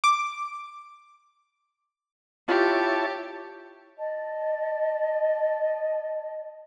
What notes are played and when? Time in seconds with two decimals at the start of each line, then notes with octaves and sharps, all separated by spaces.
0.04 D6
2.48 E4 F4 G4 C#5 A5
3.99 D5 D#5 A5